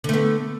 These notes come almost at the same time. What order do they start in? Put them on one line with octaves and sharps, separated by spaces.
D3 A3 B3